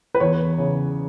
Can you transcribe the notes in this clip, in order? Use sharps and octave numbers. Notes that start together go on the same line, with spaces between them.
B4
E2 C#5
C#3